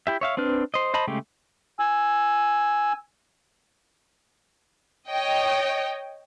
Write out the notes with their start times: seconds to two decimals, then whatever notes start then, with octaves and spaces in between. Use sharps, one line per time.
0.07 E4 G4 E5
0.21 C#5 E5 F5
0.37 C4 D4 B4 F6
0.74 C5 D#5
0.94 C5 D#5 A5 B5
1.07 C#3 G#3 A3 G4
1.80 G#5 E6
5.07 C#5 D#5 G5